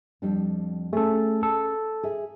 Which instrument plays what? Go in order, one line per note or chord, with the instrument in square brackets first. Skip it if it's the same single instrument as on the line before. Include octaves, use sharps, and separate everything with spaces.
[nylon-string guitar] F2 G3 D4
[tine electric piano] A3 A4 [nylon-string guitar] C#4 G#4
[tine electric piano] A4
[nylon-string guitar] G#4 E5